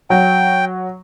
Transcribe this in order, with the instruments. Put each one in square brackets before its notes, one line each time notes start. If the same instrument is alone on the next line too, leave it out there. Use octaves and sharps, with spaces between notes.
[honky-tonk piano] F#3 [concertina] G5